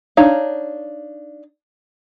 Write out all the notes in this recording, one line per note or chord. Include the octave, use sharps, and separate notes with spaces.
D4 D#4 C#5 F5